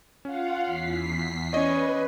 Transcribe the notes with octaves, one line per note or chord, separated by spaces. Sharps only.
C#4 F4 F5 F#5
E2 B6 C7
C#4 B4 D5 D#5